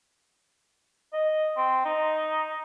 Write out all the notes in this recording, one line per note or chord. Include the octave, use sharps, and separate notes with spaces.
D#5
C4
D#4